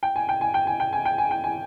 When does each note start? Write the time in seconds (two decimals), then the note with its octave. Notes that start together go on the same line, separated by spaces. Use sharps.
0.03 G5
0.16 G#5
0.29 G5
0.41 G#5
0.54 G5
0.67 G#5
0.80 G5
0.93 G#5
1.05 G5
1.18 G#5
1.31 G5
1.44 G#5